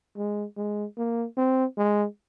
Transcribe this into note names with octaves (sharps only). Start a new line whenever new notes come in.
G#3
G#3
A#3
C4
G#3